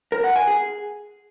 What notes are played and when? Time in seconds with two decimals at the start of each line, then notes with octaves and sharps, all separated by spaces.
0.12 A#4
0.24 F#5
0.36 G#5
0.48 G#4